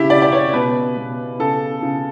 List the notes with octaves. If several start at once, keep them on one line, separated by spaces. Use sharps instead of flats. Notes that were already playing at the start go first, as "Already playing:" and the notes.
Already playing: C#3 E4 G4
C#3 D5
D5
C#5
B2 B4
B2
C#3 A4
C#3